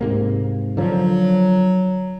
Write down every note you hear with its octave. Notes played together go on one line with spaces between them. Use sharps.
G#2 C3 A#3
D3 F3 F#3